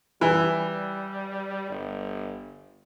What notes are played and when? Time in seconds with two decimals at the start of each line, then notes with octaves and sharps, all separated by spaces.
0.21 E3 G3
1.70 G1